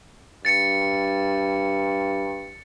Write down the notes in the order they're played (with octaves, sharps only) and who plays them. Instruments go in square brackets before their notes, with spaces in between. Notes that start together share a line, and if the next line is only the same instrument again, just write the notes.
[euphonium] G2 [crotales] A6 C#7